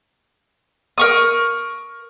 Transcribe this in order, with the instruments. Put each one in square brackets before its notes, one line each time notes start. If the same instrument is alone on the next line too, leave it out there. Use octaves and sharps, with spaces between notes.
[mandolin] A#4 C#6 D#6